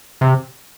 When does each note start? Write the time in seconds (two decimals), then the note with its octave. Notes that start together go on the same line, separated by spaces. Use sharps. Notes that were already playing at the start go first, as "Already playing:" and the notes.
0.21 C3